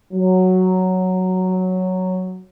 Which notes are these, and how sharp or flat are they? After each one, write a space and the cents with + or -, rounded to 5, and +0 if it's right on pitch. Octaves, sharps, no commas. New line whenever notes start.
F#3 +0